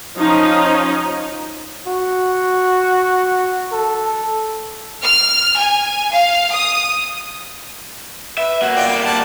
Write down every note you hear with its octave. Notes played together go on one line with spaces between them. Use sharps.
F3 C#4 D#4
F#4
A4
F6
G#5
F5
D#6
B4 E5
A#3 F#4
F4 D5 G5
G3 A#3
D5 F#5 A5